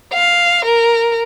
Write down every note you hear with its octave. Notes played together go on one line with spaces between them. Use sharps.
F5
A#4